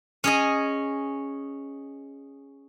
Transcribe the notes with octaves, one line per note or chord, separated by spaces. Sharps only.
C#4 G#4 D#5